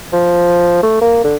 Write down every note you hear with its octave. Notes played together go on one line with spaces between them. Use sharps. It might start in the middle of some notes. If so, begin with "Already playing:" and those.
F3
A3
A#3
D3